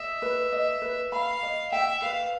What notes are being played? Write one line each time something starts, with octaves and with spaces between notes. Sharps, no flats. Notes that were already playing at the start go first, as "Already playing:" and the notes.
Already playing: D#5 E5
B4
D#5
B4
F5 B5
D#5
E5 G5
B4 F5